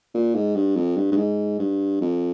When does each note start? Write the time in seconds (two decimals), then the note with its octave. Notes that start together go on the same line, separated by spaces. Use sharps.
0.14 A#2
0.35 G#2
0.56 G2
0.76 F2
0.97 G2
1.12 G2
1.17 G#2
1.59 G2
2.01 F2